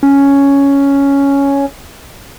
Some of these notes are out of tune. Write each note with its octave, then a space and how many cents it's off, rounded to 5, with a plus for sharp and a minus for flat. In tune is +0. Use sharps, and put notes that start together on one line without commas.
C#4 +5